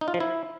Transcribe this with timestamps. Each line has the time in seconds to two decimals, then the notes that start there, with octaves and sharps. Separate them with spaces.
0.01 D#4
0.08 F4
0.14 F3
0.20 E4